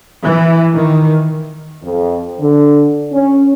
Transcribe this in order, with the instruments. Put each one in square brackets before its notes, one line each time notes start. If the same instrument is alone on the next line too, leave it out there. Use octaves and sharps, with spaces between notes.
[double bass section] E3
D#3
[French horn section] F2
D3
C#4